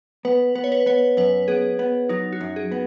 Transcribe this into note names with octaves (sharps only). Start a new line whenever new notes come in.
B3 B4
B3 B4
C#5
B4
B3 C#5
F#2 B4
B3 G#4
B3
F#3 D#4
F#4
F#2
G#4
B3